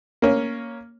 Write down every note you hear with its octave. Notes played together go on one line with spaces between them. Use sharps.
A#3 C#4